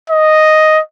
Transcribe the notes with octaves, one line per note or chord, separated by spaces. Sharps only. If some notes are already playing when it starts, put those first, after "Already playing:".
D#5